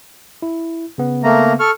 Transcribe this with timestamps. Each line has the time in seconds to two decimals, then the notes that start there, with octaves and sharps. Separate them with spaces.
0.42 E4
0.98 C#3 B3
1.24 A3 A#3 A#5
1.60 A4 C#6 F6